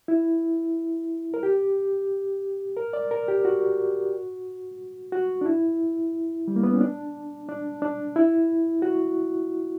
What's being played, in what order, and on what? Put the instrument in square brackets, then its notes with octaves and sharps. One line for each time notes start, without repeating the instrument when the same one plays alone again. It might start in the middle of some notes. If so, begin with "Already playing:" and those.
[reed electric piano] E4
A#4
G4
A#4
D5
A#4
G4
F#4
F#4
D4
E4
G3
A#3
B3
C#4
D4
D4
D4
E4
F#4